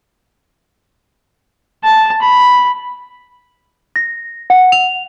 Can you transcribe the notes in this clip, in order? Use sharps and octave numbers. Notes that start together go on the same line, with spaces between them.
A5
B5
A#6
F#5
F7